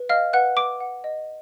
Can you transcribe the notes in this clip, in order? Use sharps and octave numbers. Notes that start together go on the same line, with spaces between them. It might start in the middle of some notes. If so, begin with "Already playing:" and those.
Already playing: B4
D#5 F5 F6
B4 F#5 F#6
B4 D6 D7
F#5
D#5